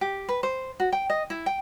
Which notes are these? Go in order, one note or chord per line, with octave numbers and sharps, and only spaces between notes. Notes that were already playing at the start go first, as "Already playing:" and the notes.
G4
B4
C5
F#4
G5
D#5
E4
G5